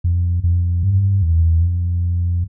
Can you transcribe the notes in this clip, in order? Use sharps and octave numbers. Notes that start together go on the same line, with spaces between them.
F2
F2
G2
E2
F2